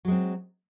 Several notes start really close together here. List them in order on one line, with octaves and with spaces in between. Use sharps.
F#3 G#3 C4